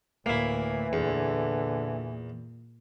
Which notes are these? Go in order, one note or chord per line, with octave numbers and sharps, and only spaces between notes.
D2 A2 E3 A#3 E4
E2 A#2 D3